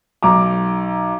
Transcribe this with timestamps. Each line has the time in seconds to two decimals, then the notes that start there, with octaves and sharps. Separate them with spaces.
0.23 B1 A#5 D6